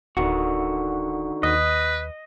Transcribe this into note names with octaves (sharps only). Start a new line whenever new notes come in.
D1 D3 D#3 F#4
D#2 B4 D#5